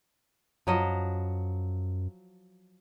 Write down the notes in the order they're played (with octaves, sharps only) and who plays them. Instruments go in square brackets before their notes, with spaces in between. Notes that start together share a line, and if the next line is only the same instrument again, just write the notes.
[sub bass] F#2 [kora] F3 F#3 D#5